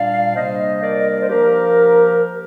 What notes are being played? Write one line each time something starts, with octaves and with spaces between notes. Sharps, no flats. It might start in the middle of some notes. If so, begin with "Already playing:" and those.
Already playing: A#2 G3 D4 D5 F5
C3 G3 A#3 D4 C5 D#5
A#4 D5
D#5
D5
C5
F3 A#3 D4 G4 A#4